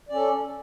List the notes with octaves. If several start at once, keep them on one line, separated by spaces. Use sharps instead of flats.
C#4 A4 D5